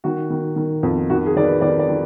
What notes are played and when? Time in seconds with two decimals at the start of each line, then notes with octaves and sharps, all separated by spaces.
0.04 D#3 F#4
0.30 D#3
0.56 D#3
0.83 F2
1.10 D#3 F#4
1.27 G#4
1.36 D#3 D5
1.44 B4
1.61 D#3 D5
1.80 D5
1.89 D#3